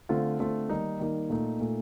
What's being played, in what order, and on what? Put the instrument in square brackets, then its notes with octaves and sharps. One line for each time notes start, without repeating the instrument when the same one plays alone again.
[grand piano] D3 A3 C4 F4
D3 A3 C4 F4
D#3 G3 A#3 D#4
D#3 G3 A#3 D#4
A#2 A3 D#4
A#2 A3 D#4